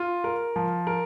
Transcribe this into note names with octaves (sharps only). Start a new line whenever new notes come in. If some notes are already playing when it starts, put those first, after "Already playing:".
Already playing: F4
A#4
F3
A#4